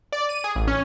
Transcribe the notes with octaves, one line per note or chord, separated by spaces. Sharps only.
D5
D#7
G#4
A1
C#4